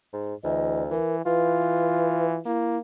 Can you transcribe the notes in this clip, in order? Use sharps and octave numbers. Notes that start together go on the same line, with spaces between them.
G#2
D2 E3 D#5
E3 A#4
E3 F4 B4
A#3 E4